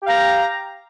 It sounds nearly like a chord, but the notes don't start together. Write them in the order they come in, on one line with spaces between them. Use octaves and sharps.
G4 F5 G5 A#5